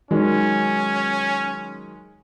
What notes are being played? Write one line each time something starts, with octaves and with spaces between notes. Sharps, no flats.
D#3 F#3 G#3 C#4